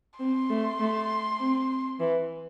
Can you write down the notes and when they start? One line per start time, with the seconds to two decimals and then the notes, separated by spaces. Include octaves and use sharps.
0.19 C4 C6
0.50 A3
0.80 A3
1.40 C4
2.00 E3